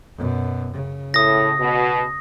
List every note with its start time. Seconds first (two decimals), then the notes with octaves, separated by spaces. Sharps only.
0.17 F#2 B2
0.73 C#3
1.14 A2 D#6 A#6
1.59 B2